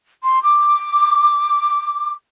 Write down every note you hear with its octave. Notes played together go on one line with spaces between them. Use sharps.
C6
D6